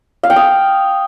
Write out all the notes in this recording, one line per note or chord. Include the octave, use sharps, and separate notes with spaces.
F5
G5
D#6